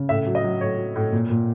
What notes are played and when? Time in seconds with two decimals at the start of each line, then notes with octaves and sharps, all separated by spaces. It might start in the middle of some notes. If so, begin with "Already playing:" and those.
Already playing: C#3
0.09 A2 E5
0.26 F#3
0.35 D#5
0.44 F#3
0.61 A2 C#5
0.78 F#3
0.96 A2
1.13 A#2
1.30 A#2